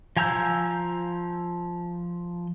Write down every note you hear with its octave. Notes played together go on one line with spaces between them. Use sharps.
F3 G#5 A#5 E6 G6